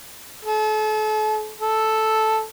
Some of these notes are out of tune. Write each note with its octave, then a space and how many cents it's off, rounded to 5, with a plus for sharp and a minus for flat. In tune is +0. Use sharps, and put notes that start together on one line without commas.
A4 -40
A4 -5